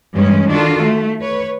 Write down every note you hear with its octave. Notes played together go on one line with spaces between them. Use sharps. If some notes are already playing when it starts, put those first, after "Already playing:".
G2 E3 G#3 C#4
D#3 D4 F4 F#4 A4
A3
B4 C#5